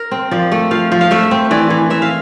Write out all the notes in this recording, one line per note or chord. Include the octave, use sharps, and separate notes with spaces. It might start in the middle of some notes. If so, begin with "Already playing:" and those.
Already playing: A#4
C4
F3 D5
A3
F3 F5
F3
F5
A3 E5
C4
E3 D5
E3
E3 E5
F5